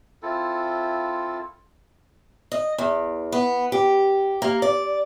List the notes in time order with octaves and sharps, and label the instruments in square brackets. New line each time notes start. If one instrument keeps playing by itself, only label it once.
[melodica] C4 E4 F4 A4
[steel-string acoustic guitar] D#5
E2
B3
G4
A#3
D5